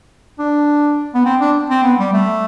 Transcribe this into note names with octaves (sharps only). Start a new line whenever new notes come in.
D4
B3
C4
D4
C4
B3
G3
A3